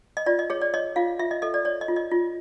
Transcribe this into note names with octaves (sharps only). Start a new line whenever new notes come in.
D#5
F4 D5
D#5
G#4 C#5
D5
C#5 D#5
F4 F5
F4 E5
D#5
A4 D#5
D5
C#5 D5
D#5
F4
D#5
F4